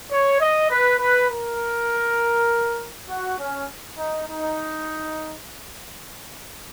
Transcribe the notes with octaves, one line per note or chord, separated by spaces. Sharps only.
C#5
D#5
B4
B4
A#4
F#4
C#4
D#4
D#4